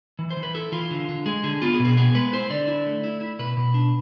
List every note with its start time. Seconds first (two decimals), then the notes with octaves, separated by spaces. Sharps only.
0.19 E3
0.31 C5
0.37 E3
0.43 B4
0.55 E4 A4
0.72 E3 F4
0.91 D3
1.09 D3
1.26 G#3 G#4
1.43 D3 G#4
1.62 B3 F4
1.74 G#4
1.79 B2
1.85 G#4
1.97 B3 G#4
2.15 G#3 B4
2.33 E4 C5
2.50 D3 D5
2.68 E4
2.86 A3
3.04 E4
3.21 E4
3.39 B2 B4
3.57 B2
3.74 D4